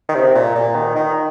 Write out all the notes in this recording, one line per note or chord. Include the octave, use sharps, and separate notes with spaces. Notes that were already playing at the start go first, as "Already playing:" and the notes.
D#3
C3
A#2
A#2
D#3
D#3